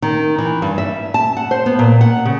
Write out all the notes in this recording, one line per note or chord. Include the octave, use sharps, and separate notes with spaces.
D#3
E3
G2
E5
A5
F#5
C5
B3
A#2
F#5
C#3